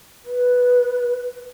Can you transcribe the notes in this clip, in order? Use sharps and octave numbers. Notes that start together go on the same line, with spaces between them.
B4